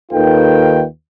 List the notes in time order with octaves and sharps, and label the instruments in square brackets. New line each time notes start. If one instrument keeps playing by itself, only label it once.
[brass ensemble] D#2 D#3 F4 A4 B4 G5